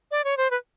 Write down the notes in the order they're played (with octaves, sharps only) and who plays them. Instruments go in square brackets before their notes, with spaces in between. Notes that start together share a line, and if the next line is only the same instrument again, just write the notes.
[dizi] D5
C#5
C5
B4